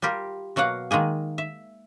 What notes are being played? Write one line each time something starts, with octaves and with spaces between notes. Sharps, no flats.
G3 F4 G4 A#4
B2 F#3 A#3 F5 F#5
D#3 G#3 A#3 G#4
E5